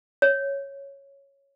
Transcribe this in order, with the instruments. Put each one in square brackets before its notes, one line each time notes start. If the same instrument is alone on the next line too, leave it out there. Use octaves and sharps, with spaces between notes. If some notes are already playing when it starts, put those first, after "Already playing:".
[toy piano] C#5